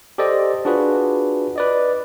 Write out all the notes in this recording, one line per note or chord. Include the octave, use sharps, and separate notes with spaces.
G4 A4 C5 D5 D#5
D4 F4 F#4 G#4 B4
B4 D5 D#5